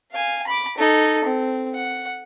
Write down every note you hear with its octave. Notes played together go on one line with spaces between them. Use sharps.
F5 G#5
B5 D6
D#4 A4
C4
F#5